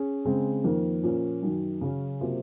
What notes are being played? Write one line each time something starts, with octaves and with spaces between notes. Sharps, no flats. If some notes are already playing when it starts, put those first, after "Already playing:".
Already playing: C#4 G#4
C#3 G#3 C4
F2 D#3 A#3
A#2 F3 A#3 C#4
F#2 D#3 F#3
C#3 F#3 C#4 F#4
C3 F#3 A#3 F4 C5